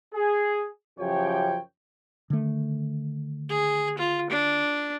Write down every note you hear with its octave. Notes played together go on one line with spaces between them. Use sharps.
G#4
F#2 C#3 F3 G4 C#5 G5
D3 D#3 A3
G#4
F4
D4